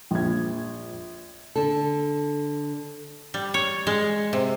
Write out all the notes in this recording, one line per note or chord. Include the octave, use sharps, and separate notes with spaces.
A#1 G#6
D3 A4
G3
C#5
G#3
C3